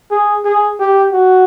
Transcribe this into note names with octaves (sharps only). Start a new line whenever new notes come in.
G#4
G#4
G4
F#4